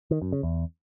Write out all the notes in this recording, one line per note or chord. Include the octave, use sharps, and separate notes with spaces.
D#3
F#2
C#3
E2